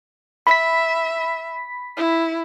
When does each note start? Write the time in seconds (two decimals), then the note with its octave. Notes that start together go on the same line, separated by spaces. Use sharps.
0.47 E5 B5 B6
1.97 E4